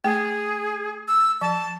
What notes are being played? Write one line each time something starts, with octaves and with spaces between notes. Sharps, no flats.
A3 G#4 G5
E6
F3 A5